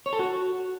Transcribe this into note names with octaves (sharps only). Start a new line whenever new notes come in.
C#5
A4
F#4